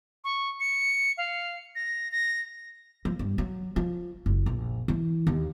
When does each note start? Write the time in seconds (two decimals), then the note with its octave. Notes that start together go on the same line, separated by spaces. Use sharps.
0.24 C#6
0.60 C#7
1.18 F5
1.75 A#6
2.11 A#6
3.05 F3
3.19 G2
3.38 F#3
3.76 F3
4.26 F#1
4.46 A#1
4.88 E3
5.27 D#2